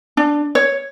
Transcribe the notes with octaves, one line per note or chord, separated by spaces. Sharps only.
D4
C#5